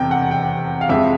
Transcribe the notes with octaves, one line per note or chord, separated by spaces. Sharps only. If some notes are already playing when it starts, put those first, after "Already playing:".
Already playing: F1 E2 C3 G5
F#5
G5
F5
F2 C3 F3 G#3 E5